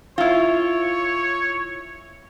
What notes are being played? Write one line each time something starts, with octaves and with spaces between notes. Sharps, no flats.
E4 F4 C#5